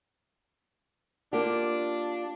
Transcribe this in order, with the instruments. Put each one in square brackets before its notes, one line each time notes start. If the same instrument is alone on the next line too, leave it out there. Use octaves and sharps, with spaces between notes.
[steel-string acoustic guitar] A#3 F4 G4 [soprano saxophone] D4